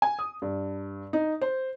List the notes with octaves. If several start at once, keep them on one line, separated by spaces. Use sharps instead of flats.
G#5
D#6
G2
D#4
C5